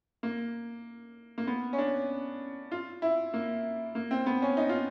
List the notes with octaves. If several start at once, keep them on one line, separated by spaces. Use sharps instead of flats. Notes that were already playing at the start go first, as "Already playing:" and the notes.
A#3
A#3
B3
C#4
D4
F4
E4
A#3
A#3
C4
B3
C#4
D#4
F4